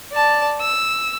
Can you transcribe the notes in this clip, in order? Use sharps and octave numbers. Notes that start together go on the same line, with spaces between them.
D5 A5
E6